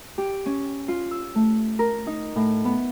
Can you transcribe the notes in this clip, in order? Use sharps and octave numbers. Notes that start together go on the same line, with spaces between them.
G4
C#4
F4
E6
A3
A#4
D#4
A2
B3